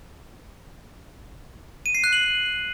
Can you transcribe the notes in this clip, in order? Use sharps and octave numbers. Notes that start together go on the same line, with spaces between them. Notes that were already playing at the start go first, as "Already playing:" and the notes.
D#7
C7
F#6
F#7